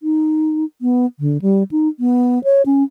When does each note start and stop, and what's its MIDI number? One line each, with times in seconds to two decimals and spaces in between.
0.03 0.65 63
0.82 1.06 59
1.20 1.38 50
1.42 1.63 55
1.71 1.88 63
2.00 2.42 59
2.44 2.62 73
2.66 2.83 61